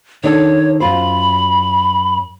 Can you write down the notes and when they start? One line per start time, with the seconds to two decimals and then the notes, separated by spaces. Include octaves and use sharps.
0.24 D#3 D4 A4 C#5
0.80 F#2 F4 C5 B5